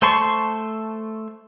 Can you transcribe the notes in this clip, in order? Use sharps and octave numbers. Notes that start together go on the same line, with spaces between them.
A3 C5 A5 C6 C#6